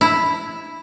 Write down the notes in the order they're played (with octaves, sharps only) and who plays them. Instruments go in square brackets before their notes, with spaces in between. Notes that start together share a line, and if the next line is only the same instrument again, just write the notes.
[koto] E4